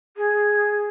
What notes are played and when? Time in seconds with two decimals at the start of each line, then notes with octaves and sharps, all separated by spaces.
0.17 G#4